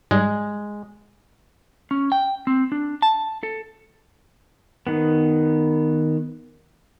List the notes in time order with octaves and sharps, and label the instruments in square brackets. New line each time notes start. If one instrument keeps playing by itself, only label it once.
[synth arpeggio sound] G#2 G3 [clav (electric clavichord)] G#3
[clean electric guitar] C#4
G5
C4
D4
A5
A4
[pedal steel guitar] D#3 B3